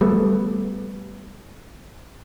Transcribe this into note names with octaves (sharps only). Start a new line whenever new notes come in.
G3 A3 B3